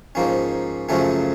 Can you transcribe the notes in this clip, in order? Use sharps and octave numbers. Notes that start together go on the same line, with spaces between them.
G#2 F3 A#3 C#4
F#2 C#3 F3 A3 C#4